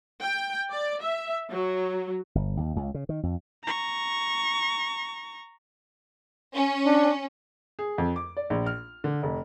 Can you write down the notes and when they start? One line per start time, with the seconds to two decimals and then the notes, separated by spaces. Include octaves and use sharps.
0.22 G5
0.71 D5
1.01 E5
1.51 F#3
2.35 G1
2.57 D#2
2.76 C#2
2.94 C#3
3.09 D#3
3.23 F2
3.64 A#5 C#6
6.56 C#4
6.86 D4
7.79 G#4
7.98 F2
8.16 D6
8.37 D5
8.50 A#1
8.66 F6
9.04 D3
9.23 F1